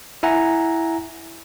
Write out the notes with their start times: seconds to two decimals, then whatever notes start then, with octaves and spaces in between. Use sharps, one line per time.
0.23 E4 E5 F#5 G#5 A#5